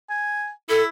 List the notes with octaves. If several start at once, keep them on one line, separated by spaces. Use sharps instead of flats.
G#5
E4 A4